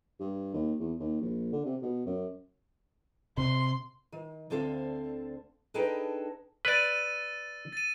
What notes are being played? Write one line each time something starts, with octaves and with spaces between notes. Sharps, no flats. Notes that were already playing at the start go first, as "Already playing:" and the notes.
G2
D#2
E2
D#2
A#1
D3
C3
B2
F#2
C3 C6
D#3
D2 D3 C4 A4 F5
D4 D#4 G#4 A4 B4 G5
B4 D5 E6 A6 D#7
A6 D#7